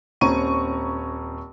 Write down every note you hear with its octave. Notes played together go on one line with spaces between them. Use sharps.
D#1 C4 C#4 A#5 C#6 D#7